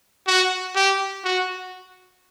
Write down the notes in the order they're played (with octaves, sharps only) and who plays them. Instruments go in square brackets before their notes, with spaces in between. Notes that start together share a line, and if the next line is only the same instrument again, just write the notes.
[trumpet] F#4
G4
F#4